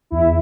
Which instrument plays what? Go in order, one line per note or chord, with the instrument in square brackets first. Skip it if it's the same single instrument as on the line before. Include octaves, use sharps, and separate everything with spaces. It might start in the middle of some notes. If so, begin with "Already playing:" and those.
[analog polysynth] E2 E4